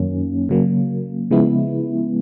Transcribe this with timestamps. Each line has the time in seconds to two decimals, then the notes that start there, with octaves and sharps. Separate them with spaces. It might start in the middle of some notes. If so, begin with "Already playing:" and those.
Already playing: F#2 D#3 F#3 A#3 C#4
0.49 C#3 F#3 A#3
1.31 C#3 F3 G#3 B3 E4